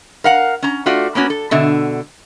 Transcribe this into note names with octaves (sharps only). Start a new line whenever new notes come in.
A#4 F5 F#5
C#4 A#5
A3 F4 F#4 D5
A#3 B3 C#4 F#4
A4
B2 D3 E5